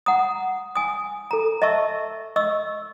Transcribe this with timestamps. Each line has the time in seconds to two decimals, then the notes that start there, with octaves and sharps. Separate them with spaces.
0.06 F#5 A#5 D#6
0.75 G#5 D#6
1.31 A4 A#5
1.62 D#5 E5 A5 C#6 E6
2.36 D#5 C#6 E6